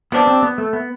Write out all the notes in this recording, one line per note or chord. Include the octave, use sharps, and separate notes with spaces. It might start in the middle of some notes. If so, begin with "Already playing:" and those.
C3 G3 B3 D4
C4
B3
A3
B3